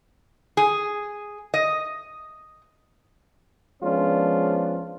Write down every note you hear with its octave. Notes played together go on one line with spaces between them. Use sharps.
G#4
D#5
F3 G#3 B3 C#4 D4 F4